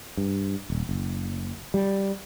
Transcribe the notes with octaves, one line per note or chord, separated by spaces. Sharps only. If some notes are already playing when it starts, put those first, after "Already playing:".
G2
D#1
F#1
G3